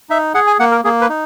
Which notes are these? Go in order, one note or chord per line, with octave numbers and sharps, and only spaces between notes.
D#4 E5
G#4 F#5
G#5
A#3 F#5
A#4
A#3 G#4
B4
D#4